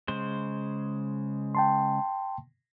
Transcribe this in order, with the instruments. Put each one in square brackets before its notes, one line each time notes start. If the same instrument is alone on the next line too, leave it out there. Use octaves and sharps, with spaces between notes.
[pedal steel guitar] C#3 G#3 C5
[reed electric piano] G5 A5 C6